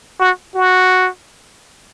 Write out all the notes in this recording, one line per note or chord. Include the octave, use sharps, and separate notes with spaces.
F#4
F#4